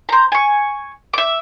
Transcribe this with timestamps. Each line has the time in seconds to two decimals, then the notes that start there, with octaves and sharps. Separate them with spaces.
0.09 C5 A#5
0.32 G#5 C#6
1.13 E5 D6